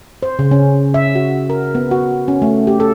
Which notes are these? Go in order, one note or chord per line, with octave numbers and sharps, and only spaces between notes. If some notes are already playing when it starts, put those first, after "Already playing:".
C5
C#3
C#4
E5
F#4
A#4
B3
F#4
C#4
A3
G4
A4